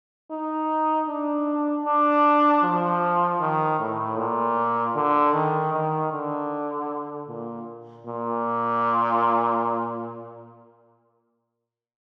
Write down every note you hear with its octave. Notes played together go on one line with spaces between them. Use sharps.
D#4
D4
D4
F3
D#3
A2
A#2
D3
D#3
D#3
D3
A#2
A#2